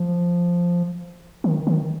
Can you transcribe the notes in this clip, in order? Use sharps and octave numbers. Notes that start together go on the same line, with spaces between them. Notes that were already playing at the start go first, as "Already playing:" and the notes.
Already playing: F3
D#3
D#3